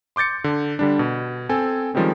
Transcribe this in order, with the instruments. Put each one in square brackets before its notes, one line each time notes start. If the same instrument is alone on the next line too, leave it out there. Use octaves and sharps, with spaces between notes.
[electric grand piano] C6 D6 G6 A6 C#7
D3
D3 G3 D4
B2
C4 A4 G#5
D#3 F3 G3 G#3 C4 C#4